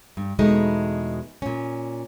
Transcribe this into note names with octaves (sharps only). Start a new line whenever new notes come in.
G2
E2 B2 G#3 A3 D#4
A#2 C#4